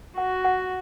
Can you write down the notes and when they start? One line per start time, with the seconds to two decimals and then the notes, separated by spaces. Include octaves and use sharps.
0.18 F#4 F#5
0.44 F#5